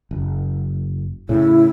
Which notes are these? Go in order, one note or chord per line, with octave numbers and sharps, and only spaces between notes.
F#1
A2 C#3 E4